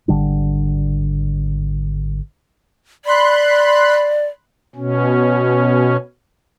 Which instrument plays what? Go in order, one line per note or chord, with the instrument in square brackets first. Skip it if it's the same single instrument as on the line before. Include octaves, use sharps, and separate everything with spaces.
[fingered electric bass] G#1 D3 G3 D4
[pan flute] D5 [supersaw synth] B5 C6 F#6
[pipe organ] B2 C#4